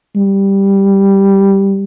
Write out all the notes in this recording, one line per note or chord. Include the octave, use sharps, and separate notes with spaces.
G3